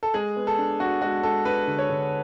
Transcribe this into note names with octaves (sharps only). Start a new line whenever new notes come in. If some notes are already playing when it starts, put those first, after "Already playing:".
A4
G#3 G#4
B3
A4
D4
D4 F#4
G#3 F#4
G#3 A4
D4 B4
D3
C#5
D3